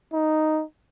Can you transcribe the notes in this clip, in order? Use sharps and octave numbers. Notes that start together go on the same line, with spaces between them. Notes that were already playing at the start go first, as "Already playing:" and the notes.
D#4